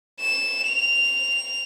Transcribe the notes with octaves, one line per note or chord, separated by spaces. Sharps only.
E7
F7